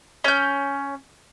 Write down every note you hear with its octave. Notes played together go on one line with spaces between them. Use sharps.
C#4 G6